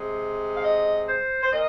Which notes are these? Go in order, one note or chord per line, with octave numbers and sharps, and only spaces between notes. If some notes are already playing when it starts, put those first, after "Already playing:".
Already playing: C3 G#3
F5
D#5
C5
C5
A#2 D#5